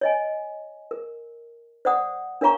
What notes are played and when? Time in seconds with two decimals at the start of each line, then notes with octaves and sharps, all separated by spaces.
0.01 C#5 D#5 G#5
0.91 A#4
1.85 C5 D5 F#5 D#6
2.41 D4 A#4 C#5 F5 A#5 C#6